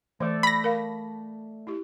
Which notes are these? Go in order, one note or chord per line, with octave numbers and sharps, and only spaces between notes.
E3 A3 A4 C5 D5
B5 A#6
A#4 F5
E4 G4